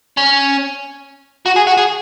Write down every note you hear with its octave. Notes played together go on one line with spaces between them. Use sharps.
C#4
F#4
G#4
F#4
G#4